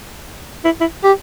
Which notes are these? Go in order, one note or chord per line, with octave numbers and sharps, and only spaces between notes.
E4
E4
G4